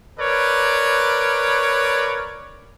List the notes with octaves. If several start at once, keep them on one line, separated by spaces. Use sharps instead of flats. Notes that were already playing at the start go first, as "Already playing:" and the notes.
A#4 B4 C#5 D5